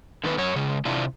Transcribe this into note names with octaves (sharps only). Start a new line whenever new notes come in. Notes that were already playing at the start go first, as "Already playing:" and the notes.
D3 D#3 B3 B4
F#2 C#5
C#3 G#3 G#4
C3 D4 E4 F4